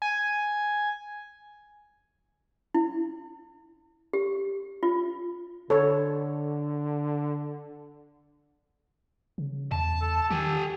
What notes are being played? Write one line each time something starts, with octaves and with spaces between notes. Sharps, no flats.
G#5
E4
G4
F4
D3 A4 C#5
C#3
E2 A5
A4
D#3 G4 G#5